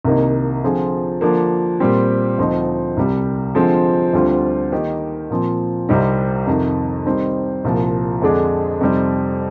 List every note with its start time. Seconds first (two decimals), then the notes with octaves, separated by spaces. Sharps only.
0.05 C2 C3 D#3 A#3 D#4
0.63 D3 F3 C4 F4 G#4
1.21 D3 F3 A#3 D4
1.80 A#2 G3 C4 G4
2.38 D2 D3 F3 C4 D#4
2.97 C2 C3 G3
3.55 D3 F3 G#3 C4
4.13 D2 D3 G3 C4 F4
4.72 D#3 A#3 D#4 G4 A#4
5.30 A#2 F3 C4
5.89 C2 C3 G3 C4 D#4
6.47 F2 C3 D#3
7.06 D#3 G3 C4 D#4
7.65 C2 A#2 F3
8.22 F2 D3 G#3 D4 G#4
8.81 F2 C3 G3 C4 D#4